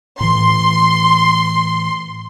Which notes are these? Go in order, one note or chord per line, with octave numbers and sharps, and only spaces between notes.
A2 E3 C6